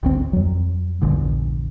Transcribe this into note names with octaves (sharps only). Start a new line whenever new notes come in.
G#1 D2 C4
F2 F#3
A#1 E2 G2 D3